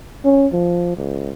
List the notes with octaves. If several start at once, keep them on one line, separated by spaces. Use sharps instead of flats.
C#4
F3
C#2